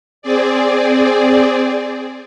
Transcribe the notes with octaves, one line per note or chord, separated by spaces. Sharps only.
C4 G#4 D5